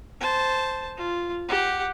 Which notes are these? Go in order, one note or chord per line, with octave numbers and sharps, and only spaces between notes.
C5 A5
F4
G4 F#5